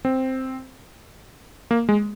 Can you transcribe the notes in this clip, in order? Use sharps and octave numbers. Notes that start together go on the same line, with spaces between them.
C4
A#3
G#3